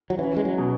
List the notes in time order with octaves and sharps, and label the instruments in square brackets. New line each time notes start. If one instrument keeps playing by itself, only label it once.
[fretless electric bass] F#3
[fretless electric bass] E3 [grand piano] C#4
[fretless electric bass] G#3
F#3
[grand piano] B2